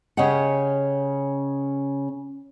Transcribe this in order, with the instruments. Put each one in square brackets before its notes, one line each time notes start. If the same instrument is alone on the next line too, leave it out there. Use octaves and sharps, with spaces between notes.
[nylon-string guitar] C#3 C#4 G4 D#5 F#5